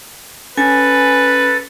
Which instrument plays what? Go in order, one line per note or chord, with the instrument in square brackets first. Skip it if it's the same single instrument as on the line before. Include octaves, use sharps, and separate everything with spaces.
[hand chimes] C#4 [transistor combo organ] A4 [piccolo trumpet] B4 [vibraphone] G#5